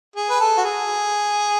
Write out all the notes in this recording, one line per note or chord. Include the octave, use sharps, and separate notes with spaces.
G#4
B4
A4
F#4
G#4